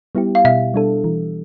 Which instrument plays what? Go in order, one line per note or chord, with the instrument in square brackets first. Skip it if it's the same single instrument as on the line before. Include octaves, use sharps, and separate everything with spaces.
[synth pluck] G3 B3 E4 G4
[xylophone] F5
[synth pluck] B2 [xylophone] E5
[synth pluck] G3 D4 A4
E3